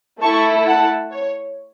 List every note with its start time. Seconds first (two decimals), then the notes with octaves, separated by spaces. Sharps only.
0.22 A3 E4 A4 A5 C#6
0.67 F#5 A5
1.12 C#5